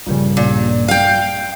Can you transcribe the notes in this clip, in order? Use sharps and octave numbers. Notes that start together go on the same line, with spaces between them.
A#1 G2 C#3
A#2
F5 G5